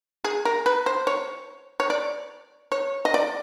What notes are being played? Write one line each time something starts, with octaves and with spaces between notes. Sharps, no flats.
G#4
A#4
B4
C5
C#5
C#5
D5
C#5
D#5
D5